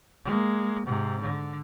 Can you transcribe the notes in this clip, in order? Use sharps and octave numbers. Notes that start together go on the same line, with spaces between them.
G#3 A#3
G#2 C3
D3